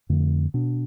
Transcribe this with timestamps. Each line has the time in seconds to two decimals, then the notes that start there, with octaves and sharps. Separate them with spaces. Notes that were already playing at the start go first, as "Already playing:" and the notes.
0.09 F2 D3 A3
0.54 B2 B3 D4